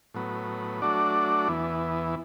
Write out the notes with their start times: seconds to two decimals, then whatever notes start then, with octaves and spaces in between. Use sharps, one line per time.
0.14 A2 F#3 B3
0.82 F#3 A3 D4 F#4 D5
1.48 E2 E3 B3